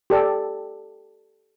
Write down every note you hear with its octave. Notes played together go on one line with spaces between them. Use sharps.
G4 A4 D5